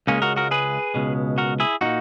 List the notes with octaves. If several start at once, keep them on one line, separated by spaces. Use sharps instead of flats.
C#2 C#3 G#3 A#3 C#4
F#4 A#4
F#4 A#4
G#4 B4
C#2 B2 G#3
F#4 A#4
E4 G#4
A#2 A#3 D#4 F#4